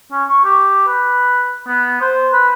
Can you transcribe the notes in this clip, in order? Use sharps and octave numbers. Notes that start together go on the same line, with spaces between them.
C#4
C#6
G4
B4
B3
C5
B4